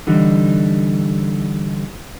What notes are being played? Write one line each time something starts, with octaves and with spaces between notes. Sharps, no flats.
D3 E3 G3 D#4